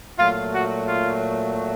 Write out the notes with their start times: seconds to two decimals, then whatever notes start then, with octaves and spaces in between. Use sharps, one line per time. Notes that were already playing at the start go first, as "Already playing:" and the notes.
0.17 A#2 F#3 A3 F4
0.53 F#4
0.88 F4